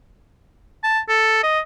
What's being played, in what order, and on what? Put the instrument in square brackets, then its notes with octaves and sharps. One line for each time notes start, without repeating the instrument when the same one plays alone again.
[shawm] A5
A4
D#5